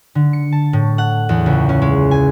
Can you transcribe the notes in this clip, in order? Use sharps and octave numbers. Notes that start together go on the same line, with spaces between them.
D3
C#7
A5
A2
F#5
E2
C#2
C#4
G#3
G#5